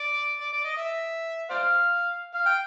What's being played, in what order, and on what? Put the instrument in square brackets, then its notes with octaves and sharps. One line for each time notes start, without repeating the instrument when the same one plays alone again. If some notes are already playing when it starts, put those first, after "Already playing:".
Already playing: [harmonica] D5
D5
D5
D#5
E5
C5 D5 F5
F5
G5